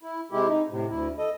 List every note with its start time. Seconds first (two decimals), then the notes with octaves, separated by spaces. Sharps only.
0.03 E4
0.32 C3 G#3 E4 G4
0.48 D#4
0.70 A2 C3
0.90 D2 E4
1.18 A4 D#5